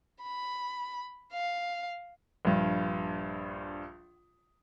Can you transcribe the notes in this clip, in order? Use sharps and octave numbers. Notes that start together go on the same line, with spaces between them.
B5
F5
A#1 G2